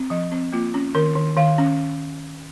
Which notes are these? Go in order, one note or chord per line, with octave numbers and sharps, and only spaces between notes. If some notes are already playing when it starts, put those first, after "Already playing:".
Already playing: C4
F3 D#5
C4
A#3 F4
C#4
D#3 A#4
D#3
D#3 F5
C#4